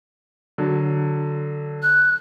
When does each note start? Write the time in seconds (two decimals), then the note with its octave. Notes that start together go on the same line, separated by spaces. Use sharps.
0.58 D3 F#3
1.82 F#6